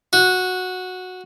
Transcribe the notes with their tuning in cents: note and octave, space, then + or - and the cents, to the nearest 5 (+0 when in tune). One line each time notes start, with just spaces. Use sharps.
F#4 -10